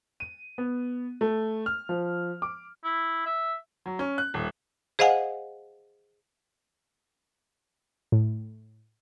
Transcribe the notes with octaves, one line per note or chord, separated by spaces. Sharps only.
D#7
B3
A3
F6
F3
D6
E4
E5
F#3
C#4
F#6
D#1
G#4 C5 D#5 F5 F#5 G#5
A2